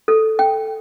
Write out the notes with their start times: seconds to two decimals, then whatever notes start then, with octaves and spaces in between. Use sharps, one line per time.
0.08 A4
0.39 G5